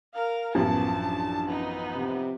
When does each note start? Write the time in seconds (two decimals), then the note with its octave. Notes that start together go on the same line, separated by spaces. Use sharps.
0.14 A#4 F5
0.55 A1 F#2 F3 B3 A5
0.94 D4
1.46 B3 D#4
1.95 C3